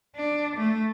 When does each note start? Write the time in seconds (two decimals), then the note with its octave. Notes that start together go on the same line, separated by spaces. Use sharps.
0.16 D4
0.56 A3